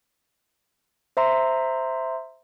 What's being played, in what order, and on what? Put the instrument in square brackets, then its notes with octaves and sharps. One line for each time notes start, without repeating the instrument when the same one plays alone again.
[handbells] C5 E5 A#5 C6